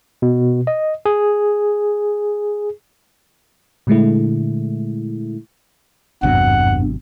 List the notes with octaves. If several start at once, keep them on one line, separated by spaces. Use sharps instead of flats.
B2
D#5
G#4
A#2 D3 G#3 A3 E4
G#1 E2 G2 C3 F#3 F#5